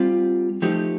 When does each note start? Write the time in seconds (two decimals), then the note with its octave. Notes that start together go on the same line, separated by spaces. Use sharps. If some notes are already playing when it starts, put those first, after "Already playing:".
Already playing: G3 C4 F4
0.62 F3 A3 D#4 G4